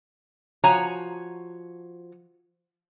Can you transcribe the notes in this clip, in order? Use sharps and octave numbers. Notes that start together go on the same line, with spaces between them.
F3 F#4 C#5 G#5 A#5